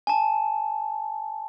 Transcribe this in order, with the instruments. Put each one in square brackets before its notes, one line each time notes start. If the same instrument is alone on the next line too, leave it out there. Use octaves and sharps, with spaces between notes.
[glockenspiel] G#5 A5